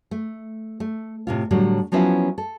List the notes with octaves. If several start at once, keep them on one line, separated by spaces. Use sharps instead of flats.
A3
A3
A2 C3 F4
A2 D3 F#3 G3
F3 F#3 B3 C#4 E4 F4
A4